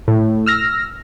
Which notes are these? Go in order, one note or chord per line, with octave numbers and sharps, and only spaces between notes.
A2
E6 F6 A#6